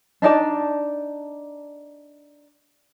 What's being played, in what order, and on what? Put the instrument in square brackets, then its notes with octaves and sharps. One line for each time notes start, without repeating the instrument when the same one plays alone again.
[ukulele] D4 D#4 D5 A5